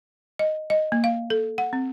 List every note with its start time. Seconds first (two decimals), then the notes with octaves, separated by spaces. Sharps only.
0.39 D#5
0.70 D#5
0.92 A#3
1.04 F5
1.30 A4
1.58 F#5
1.73 C4